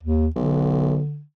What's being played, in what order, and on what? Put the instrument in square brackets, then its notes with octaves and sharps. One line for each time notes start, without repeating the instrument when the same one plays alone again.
[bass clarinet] D#2
[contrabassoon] B1 [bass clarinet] D3